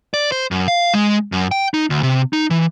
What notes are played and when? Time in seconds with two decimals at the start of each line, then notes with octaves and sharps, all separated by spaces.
0.14 D5
0.32 C5
0.51 F#2
0.68 F5
0.94 G#3
1.32 F#2
1.51 G5
1.74 D#4
1.90 D2
2.03 C3
2.33 D#4
2.50 E3